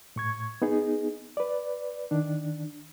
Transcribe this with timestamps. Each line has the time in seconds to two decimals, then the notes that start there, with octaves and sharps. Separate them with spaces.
0.16 A2 C#6 G#6
0.62 B3 D#4 G#4
1.37 B4 D5
2.11 D#3 D4